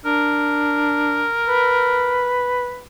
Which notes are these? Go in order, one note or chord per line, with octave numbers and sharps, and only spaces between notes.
D4 A#4
B4